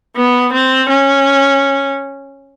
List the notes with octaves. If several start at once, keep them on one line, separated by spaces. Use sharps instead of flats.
B3
C4
C#4